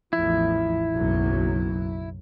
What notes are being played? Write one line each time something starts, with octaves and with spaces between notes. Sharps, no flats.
A1 E2 F3 E4
F#1 B1 F#3